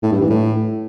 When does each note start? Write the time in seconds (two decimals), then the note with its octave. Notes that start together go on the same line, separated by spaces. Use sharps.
0.03 A2
0.12 G2
0.21 E3
0.30 A2